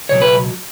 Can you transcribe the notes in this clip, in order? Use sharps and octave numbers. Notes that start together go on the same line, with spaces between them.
C#2 B2 F#3 C#5
B4